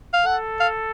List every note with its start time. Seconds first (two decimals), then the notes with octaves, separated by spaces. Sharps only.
0.13 F5
0.25 A4 F#5
0.60 F5